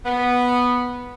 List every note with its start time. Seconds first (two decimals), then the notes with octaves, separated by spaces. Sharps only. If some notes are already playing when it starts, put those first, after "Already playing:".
0.05 B3